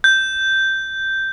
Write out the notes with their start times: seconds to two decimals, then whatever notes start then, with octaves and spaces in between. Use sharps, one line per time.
0.04 G6